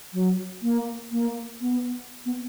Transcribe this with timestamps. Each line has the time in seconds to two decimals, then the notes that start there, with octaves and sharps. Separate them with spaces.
0.13 F#3
0.62 A#3
1.11 A#3
1.61 B3
2.25 B3